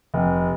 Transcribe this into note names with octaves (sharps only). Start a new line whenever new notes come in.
F1